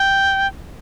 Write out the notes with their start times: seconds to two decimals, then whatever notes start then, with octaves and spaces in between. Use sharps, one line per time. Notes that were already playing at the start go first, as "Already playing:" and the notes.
Already playing: G5